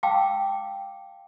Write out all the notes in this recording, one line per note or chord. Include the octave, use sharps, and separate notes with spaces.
F5 G5 A5 D6 E6